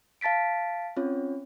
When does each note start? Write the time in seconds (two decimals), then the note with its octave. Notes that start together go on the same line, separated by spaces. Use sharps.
0.21 F5 A5 A6 B6 D7
0.97 C4 C#4 F4 C#5